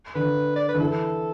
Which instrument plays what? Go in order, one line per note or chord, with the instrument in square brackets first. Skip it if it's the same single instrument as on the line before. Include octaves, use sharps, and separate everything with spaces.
[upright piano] D3 [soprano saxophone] B4
[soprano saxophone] D5
B4
[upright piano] D3
[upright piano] E3 [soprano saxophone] A4